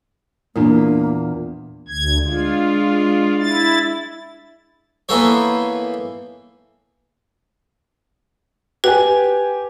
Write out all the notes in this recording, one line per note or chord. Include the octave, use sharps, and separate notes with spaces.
E2 A#2 A#3 D4 E4 A#4
D2 G#6
G#3 D4 F4
E4 A6
E3 A#3 B3 A4 C5 C#5
G4 B4 G5 G#5